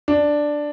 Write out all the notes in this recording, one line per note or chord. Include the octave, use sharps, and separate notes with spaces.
D4